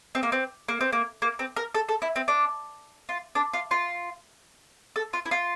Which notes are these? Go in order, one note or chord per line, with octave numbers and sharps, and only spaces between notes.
C4
A#3
C4
A#3
C4
A#3
A#3
C4
A#4
A4
A4
E4
C4
D4
F4
D4
F4
F4
A4
F4
E4
F4